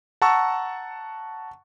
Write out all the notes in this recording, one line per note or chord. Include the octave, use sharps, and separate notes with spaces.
F#5 A5 A#5 C#6 E6